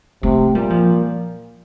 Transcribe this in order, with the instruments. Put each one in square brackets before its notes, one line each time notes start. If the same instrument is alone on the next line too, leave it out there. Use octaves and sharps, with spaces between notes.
[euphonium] C3 [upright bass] A3
[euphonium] A#2 [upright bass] G3
[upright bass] F3